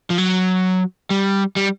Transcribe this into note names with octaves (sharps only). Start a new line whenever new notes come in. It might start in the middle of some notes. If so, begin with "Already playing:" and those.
F3
F#3
G3
G3